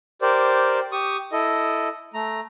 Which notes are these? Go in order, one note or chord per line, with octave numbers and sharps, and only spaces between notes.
G4 A#4 C5 D5
G4 C#6 D#6
E4 A4 D#5
A3 A#5